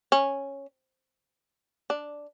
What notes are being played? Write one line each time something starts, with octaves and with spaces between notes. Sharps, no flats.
C#4
D4